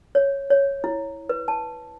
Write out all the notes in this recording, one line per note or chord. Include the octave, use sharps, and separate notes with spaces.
C#5
C#5
E4
B4
A5